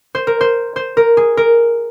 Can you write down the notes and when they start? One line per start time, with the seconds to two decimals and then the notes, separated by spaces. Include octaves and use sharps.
0.15 C5
0.27 A#4
0.41 C5
0.76 C5
0.97 A#4
1.17 G#4
1.37 A#4